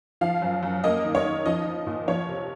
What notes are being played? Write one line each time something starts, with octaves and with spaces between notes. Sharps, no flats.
F3 F5
F#2
F#2
A#3 D#5
D#3
C#5
D#3
F3 D#5
D#4
A#2
F3 C#5
C3